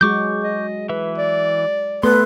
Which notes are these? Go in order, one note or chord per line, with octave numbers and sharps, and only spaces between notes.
F#3 G#3 F#4 C#6 D6 G6
D#5
E3 B4 E5
D5
A3 B3 A4 B4 C6